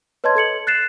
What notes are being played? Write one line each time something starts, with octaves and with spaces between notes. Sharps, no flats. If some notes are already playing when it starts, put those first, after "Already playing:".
B4 C#5 D#5 A5 C6 G#6
A4 G#6 C#7 F#7
F#6 A6 C7 E7